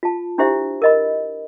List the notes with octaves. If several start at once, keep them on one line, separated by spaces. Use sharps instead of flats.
F4 A5
D4 E4 G4 C5 E5
A#4 D#5 B5